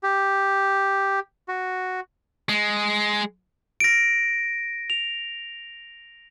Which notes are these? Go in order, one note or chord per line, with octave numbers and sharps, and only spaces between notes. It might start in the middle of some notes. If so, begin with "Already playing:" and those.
G4
F#4
G#3
A#6 D7
F7